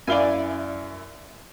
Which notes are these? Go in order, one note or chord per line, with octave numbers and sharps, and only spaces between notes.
F#2 E4 D5 F5 G#5 G7